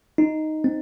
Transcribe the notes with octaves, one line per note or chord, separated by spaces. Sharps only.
D#4
C4